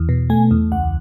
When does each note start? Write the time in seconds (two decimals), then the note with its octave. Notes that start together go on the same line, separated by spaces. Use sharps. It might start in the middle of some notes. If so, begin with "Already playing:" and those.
Already playing: E2
0.09 B2
0.30 A3 G#5
0.51 E2
0.72 C#2 F#5